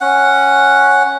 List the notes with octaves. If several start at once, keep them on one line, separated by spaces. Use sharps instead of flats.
C#4 F#5